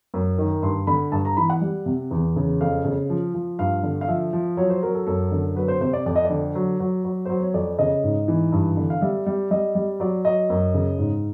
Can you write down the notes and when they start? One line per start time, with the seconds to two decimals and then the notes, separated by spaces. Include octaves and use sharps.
0.14 F#2
0.38 D#3
0.62 G2 C6
0.87 D3 B5
1.12 G2 A5
1.25 A#5
1.37 E3 B5
1.50 F#5
1.61 G3
1.86 C3
2.11 E2
2.36 C#3
2.60 F2 F5
2.85 C#3
3.10 F3
3.34 F3
3.59 G2 F5
3.83 D3
4.01 F5
4.08 F3 E5
4.33 F3
4.57 F#3 C#5
4.70 C5
4.82 F#3 A#4
4.95 A4
5.07 F#2 A4
5.32 D3
5.56 F#3 B4
5.68 C5
5.81 C3 C5
5.93 D5
6.06 F2 D5
6.16 D#5
6.25 D5
6.30 D3
6.55 F#3
6.80 F#3
7.04 F#3
7.25 F#3 C5
7.40 C#5
7.54 F2 D5
7.79 C#3 D#5
8.03 G#2
8.28 E3
8.52 G2
8.77 D3
8.90 F5
9.01 G3 E5
9.26 G3
9.51 G3 D#5
9.75 G3
10.00 F#3 D5
10.25 F#3 D#5
10.50 F#2
10.74 C#3
10.99 G#2